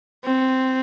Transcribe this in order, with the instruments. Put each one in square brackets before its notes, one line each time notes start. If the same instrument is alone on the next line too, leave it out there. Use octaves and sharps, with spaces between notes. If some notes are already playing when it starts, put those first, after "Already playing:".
[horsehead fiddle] C4